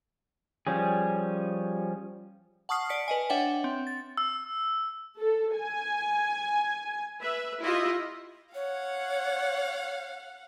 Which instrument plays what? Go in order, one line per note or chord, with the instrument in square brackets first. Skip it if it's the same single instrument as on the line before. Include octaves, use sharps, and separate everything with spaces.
[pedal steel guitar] F3 G3 C#4 G#4
[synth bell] F#5 A5 C#6 D#6 F6 C7
D5 B6 C#7
B4 D#5 G#5
D4 C#5 E5 F#5 G5
C4
A6
[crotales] E6
[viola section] A4
G#5
B4 E5
E4 F4 G4 D#5 E5
[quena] C#5 [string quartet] F5 F#5